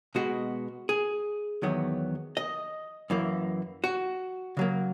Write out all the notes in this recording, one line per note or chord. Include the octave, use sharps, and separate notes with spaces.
B2 G#3 B3 F#4
G#4
E2 D#3 F#3 B3
D#5
F#2 E3 A#3
F#4
C#3 F#3 A#3